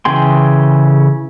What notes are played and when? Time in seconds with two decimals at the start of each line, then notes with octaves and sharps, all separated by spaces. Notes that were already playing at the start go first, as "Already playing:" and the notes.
0.05 C#3 E3 G#4 G5 C6